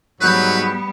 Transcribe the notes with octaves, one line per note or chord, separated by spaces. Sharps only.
G#2 F#3 G3 B3 B4 F#6 G6